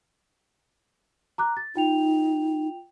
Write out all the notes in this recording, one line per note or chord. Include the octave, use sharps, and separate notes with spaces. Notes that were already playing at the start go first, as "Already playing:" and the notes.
A#5 D6 F#6
A6
D#4 F4 G5 F7